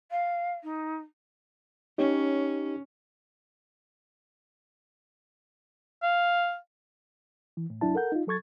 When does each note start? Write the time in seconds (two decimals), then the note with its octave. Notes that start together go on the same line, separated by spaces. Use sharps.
0.11 F5
0.63 D#4
1.98 C#4 D#4 G4 C#5
6.02 F5
7.57 E3
7.70 A2
7.81 C2 F#2 F#3 D4 E4 A5
7.95 A4 A#4 F#5 G6
8.12 D#4 F4
8.27 F#3 A4 C#6 G#6 A6